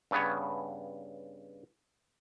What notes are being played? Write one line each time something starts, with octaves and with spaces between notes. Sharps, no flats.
G2 C#3 B3 C#5